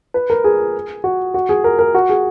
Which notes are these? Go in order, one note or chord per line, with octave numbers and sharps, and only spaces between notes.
B4
A#4
G#4
F#4
F#4
G#4
A#4
A#4
F#4
G#4